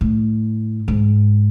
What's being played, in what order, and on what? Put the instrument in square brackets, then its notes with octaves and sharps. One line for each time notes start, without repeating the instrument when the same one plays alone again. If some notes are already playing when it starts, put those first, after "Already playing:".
[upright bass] A2
G#2